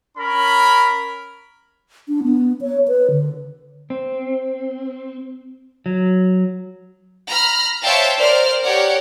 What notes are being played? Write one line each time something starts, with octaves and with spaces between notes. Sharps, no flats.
C#4 A#4 B5
D4
B3
C#5
B4
D3
C4
F#3
A#5 B5 F6
C5 C#5 E5 F5 G5 A5
A#4 C5 D5 F6
G4 A#4 C#5 D5 F#5